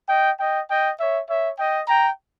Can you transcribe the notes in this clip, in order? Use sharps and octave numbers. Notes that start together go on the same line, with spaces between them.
D#5 G5
D#5 G5
D#5 G5
C#5 E5
C#5 E5
D#5 G5
G5 A#5